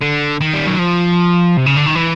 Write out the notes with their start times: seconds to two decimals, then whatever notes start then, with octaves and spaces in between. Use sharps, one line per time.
0.02 D3
0.41 D#3
0.54 G3
0.67 F#3
0.79 F3
1.57 C3
1.66 C#3
1.76 D3
1.86 D#3
1.95 E3